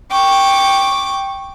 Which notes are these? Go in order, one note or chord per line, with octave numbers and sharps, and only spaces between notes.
G5 C#6 D6